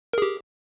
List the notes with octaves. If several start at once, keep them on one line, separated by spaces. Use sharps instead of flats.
G4 G#4 A#4